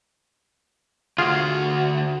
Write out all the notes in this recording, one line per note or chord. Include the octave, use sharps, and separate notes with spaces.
D2 F4 F#4 G#4